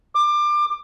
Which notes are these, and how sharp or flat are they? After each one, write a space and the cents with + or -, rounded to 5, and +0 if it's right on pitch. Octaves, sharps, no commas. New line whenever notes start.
D6 +25